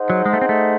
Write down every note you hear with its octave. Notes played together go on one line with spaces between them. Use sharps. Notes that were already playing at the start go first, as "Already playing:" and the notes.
Already playing: D#4 G#4 C5 D#5 F#5
F#3
G#3
A3
C4
A3